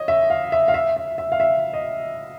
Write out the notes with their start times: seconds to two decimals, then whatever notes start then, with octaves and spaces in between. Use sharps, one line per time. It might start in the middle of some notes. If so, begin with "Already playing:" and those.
Already playing: C#5 D#5
0.08 E5
0.30 F5
0.52 E5
0.68 F5
0.74 E5
0.97 E5
1.18 E5
1.32 F5
1.40 E5
1.73 D#5